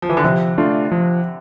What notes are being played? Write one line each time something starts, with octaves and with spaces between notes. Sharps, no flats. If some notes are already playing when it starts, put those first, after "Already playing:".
F3
E3
D3
C3 F3
A3 D4 F4
F3